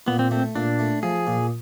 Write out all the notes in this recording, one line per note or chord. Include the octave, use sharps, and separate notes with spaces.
A#2 B3
C4
A3 C4
A#2 D4
A3
F3 G#4
A#2